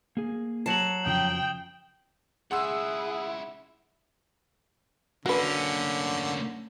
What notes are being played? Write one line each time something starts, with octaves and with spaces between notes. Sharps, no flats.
A#3 G#4
F#3 A5 C7 E7 F#7
F2 C#3 F3 G5 D#6
C#2 E4 G#4 F#5 C6 E6
D3 A#3 C#4 F#4 B4